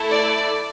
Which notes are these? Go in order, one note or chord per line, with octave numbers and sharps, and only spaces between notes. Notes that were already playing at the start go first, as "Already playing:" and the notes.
Already playing: A3 E4 A4
D5